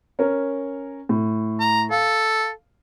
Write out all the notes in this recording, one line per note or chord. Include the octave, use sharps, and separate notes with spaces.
C#4 A#4
A2
A#5
A4 F5